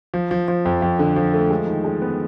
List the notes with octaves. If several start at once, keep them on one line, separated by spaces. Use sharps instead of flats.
F3
F3
F3
F2
F2
D3
F3
A3
G#3
D#3
G#3
B3